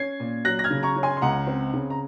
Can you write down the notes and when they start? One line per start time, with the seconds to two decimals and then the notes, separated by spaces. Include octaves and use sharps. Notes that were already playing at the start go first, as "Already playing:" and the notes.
Already playing: C#4 G#6 C7
0.20 A#2
0.45 F#3 F#6 A#6
0.59 A#6
0.64 F6 G#6
0.70 C#3
0.83 A#5 C#6
0.96 C#4
1.03 G#5 C6
1.17 C6
1.21 C#2 F#5 A#5
1.47 C4
1.73 C#3
1.90 A#5